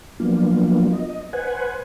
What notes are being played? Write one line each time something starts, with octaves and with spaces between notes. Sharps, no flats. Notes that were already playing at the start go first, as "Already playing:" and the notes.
F3 F#3 A#3 B3 D4 F4
D#5
B4 C5 F#5 G#5